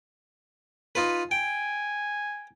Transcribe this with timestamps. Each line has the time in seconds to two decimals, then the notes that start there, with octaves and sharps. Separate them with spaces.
0.95 D#4 F4 B4
1.31 G5 G#5